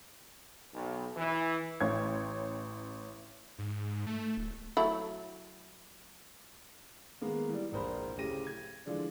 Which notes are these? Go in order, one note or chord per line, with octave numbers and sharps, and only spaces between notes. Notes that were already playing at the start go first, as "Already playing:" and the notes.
B1
E3
A1 C#5 G#6
G#2
A3
D1
F#3 A3 E4
D#3 G#3 A#3 B3
E3 G3
E1 A#1 A#4 C5 B5
D1 C#3 A3 G4 A#6 D#7
G#6
D3 E3 F3 G#3 D4